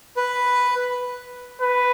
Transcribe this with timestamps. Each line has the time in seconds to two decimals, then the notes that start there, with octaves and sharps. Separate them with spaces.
0.17 B4
1.61 B4